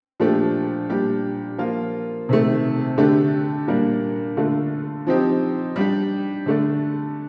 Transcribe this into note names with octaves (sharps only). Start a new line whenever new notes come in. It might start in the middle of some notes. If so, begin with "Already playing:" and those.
A#2 F3 A3 D4 G4
A#2 G3 D4 G4
F3 A#3 F4
C3 D#3 A3
D3 A3 D4 G4
A#2 G3 A#3 D4
D3 A3 D4 F4
F3 C4 D#4 G4
G3 D4 G4
D3 A3 D4